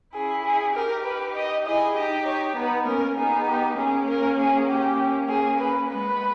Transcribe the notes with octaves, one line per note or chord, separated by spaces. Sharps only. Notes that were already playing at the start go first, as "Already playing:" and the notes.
C#4 E4 G#4
G#4
D#4 G4 A#4
B4
D#5
E4 G#4 D#5
D#4 G4 D#5
C#5
B3 D#4 B4
A#3 C#4 A#4
B3 D#4 G#4
G4
A#3 C#4 G#4
A#4
G#4
G4
A#3 C#4
G#4
B4
G#3 B3 B4